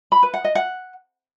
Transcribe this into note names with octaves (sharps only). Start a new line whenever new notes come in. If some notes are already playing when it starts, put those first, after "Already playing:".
B5
B4
F#5
D#5
F#5